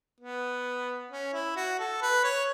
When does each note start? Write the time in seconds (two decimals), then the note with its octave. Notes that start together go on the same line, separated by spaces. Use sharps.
0.20 B3
1.11 C#4
1.34 E4
1.56 F#4
1.79 A4
2.02 B4
2.24 C#5